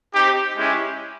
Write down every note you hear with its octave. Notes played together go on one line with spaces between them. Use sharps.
C4 D#4 G4
G#3 C#4 E4 G4